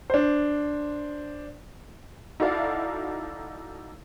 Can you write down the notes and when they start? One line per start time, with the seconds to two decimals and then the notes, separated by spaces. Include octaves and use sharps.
0.10 D4 C5
2.40 D#4 E4 F#4 A4 D5 F5